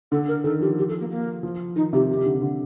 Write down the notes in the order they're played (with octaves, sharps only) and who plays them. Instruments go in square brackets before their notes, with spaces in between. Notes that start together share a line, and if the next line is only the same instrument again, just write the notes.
[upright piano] D3 [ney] A4
[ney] A#4
[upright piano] D#3 [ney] A4
[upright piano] F3 [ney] G4
[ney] G4
A4
A#3
A#3
[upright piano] F3
[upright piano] D#3 [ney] D#4
[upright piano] C3 [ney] G4
[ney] G4
[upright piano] C3
D3
C3
D3